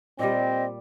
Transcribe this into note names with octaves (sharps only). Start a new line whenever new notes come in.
A#2 G3 C4 D#5